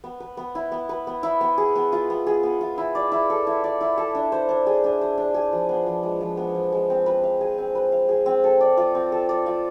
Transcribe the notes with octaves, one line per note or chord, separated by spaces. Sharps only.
B3
B4
B3
E4
B3
B4
B3
E4
B3
G#4
B3
F4
B3
G#4
B3
F4
E4
D5
E4
A4
E4
D5
E4
A4
D4
C5
D4
G#4
D4
C5
D4
G#4
F3
B3
F3
G#3
F3
B3
F3
G#3
C4
B4
F5
G#4
C4
B4
F5
G#4
C4
A4
D5
F4
C4
A4
D5
F4